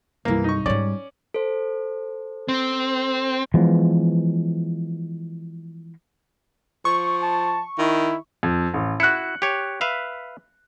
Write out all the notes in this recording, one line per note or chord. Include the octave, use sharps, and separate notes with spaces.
C2 G2 E3 A#3
D#4 C#6
G#2 G3 C#4 D5
A4 C5
C4
E3 F3 G#3 B3
F3 C#6
A5
D#3 E4
F2
A1
E4 F#4 F#6 C#7
G4 C#5
B4 E5 F5